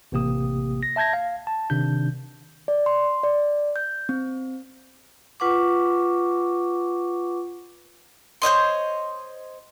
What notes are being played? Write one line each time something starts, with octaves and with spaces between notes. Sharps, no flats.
A1 C3 A#3 G4 D#6
A#6
E5 A5 G6 G#6 A#6
F5
A5
C3 D#3 D4 G6
D5
C6
D5
G6
C4
F4 B4 F#5 C#6 D6
C5 C#5 D#5 C6